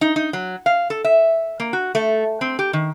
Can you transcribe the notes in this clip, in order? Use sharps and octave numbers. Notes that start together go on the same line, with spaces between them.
D#4
D#4
F#3
F5
A4
E5
A#3
F#4
A3
C4
G4
D#3